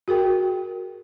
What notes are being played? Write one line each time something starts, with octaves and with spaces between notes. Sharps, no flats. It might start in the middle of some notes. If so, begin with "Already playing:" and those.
F#4 G#4 A#4 G5